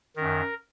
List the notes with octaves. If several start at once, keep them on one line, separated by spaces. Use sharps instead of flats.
F#2 D#3 A#4